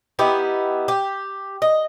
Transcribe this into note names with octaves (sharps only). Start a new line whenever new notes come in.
B3 D#4 E4 G4
G4
D#5